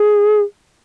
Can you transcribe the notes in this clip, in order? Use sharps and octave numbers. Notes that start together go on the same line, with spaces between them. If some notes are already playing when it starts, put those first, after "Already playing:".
Already playing: G#4